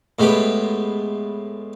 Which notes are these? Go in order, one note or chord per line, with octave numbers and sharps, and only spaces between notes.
A2 G#3 B3 G4